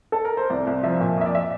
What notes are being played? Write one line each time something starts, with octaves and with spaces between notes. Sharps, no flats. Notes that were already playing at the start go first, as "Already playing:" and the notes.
A4
A#4
C5
C2 D5
C2
F3 E5
A#2
F2 E5
D5
E5